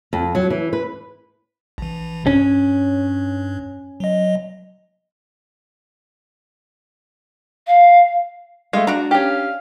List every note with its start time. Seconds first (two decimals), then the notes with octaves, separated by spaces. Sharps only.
0.13 F2
0.35 F#3
0.50 E3
0.73 B4
1.78 A#1 E3
2.27 G2 C#4
4.00 F#3 D#5
7.67 F5
8.73 G#3 A3 F5
8.87 D4 F#4 A#5
9.11 C#4 G4 F5